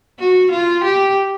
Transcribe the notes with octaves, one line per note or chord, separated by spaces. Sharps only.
F#4
F4
G4